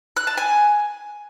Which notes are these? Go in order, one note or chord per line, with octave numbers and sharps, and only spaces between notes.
F#6
A5
G#5